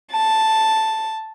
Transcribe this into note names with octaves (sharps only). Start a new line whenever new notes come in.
A5